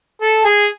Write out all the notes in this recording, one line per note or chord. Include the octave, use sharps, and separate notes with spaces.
A4
G#4